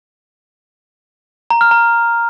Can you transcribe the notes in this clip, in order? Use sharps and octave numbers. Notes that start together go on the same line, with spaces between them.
A#5
F6
A#5